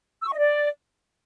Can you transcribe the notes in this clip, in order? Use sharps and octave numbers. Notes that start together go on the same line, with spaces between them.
E6
C#6
D#5
D5